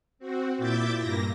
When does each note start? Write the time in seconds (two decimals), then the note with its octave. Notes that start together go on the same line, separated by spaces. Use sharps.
0.19 C4 F#4
0.58 A#2 E4 E5 D6 G6 A6
0.97 G2 A#2 A#3 A#6